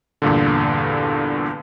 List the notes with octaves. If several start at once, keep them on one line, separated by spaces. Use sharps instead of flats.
E2 G2 A#2 D3